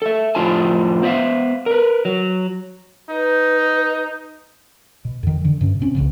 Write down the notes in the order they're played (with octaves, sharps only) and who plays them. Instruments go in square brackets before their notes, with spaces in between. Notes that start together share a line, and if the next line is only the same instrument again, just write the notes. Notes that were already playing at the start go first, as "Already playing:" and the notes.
[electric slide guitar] A4 E5
F2 A2 F4 C5 G#5 A5
B3 C5 D5 E5 F5
A#4 B4
F#3
[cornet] D#4 [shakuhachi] B4
[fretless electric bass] B2
F2 D#3
D3 E3
G2 C3 C#4
C3 C4 C#4
C#2 A2 C#3